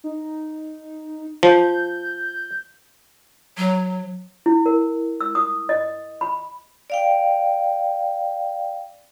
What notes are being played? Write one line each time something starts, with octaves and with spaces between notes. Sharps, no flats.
D#4
F3 G6
F#3
E4
A#4
E6
D#6
D#5
B5
D5 F5 G5